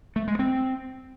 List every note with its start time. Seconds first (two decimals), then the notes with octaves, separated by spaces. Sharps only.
0.16 A3
0.28 G#3
0.39 C4